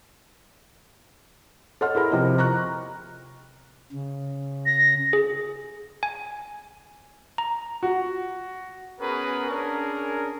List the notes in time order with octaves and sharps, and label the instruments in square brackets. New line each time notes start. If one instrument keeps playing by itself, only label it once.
[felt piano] A4 C#5 D#5 F#5 C6 F6
E4 G#4 A#4 B5
C3 F3 C5 D#5
A#5 C#6 F#6
[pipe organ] C#3
[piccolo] A#6
[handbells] G#4
G#5
A#5
[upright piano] F#4
[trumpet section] B3 C#4 F#4 G#4 A#4 B4
C#4 D4 G#4 A#4